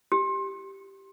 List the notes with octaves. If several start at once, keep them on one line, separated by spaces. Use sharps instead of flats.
G4